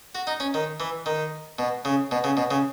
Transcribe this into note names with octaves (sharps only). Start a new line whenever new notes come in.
F#4
D#4
C#4
D#3
E3
D#3
B2
C#3
B2
C#3
B2
C#3